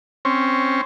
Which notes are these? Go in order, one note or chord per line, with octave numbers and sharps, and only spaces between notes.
C4 C#4